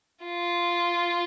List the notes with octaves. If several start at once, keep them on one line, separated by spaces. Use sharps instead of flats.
F4